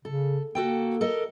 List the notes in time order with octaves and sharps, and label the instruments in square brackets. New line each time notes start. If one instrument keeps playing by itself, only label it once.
[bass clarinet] C#3 [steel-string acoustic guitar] A4
[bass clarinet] A#3 [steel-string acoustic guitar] F#4 A4 G5
[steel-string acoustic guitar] A4 A#4 D#5